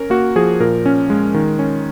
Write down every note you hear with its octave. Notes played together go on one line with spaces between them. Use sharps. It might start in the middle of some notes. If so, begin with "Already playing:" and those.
Already playing: C#4 A#4
A#3 F#4
F3 G#4
A#2 A#4
C#4
G#3
D#3
C#4